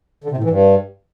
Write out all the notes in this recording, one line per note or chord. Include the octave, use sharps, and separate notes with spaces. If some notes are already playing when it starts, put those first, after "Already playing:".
D3
C3
A2
E3
G2